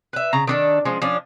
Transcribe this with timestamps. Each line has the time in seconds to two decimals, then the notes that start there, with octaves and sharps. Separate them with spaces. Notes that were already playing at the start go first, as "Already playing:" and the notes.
0.13 B4 E5
0.33 C#3 A#5
0.47 D#3 D4 A4
0.85 F3 G#3 C#4
1.02 F3 C#4 D4